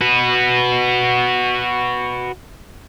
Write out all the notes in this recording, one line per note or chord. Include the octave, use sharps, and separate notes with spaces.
F#4 B4